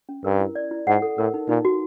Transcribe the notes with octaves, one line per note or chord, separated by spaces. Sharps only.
C#4
G2 A#4
E4
D5
E4
G#2 F#5
A4
A2 A#4
D#4
A#2 D#4
F#4